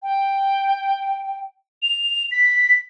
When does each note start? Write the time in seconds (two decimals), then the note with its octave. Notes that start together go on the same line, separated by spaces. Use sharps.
0.03 G5
1.83 F7
2.31 B6